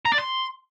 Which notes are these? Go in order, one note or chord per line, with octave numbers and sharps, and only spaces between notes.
A#5
D5
C6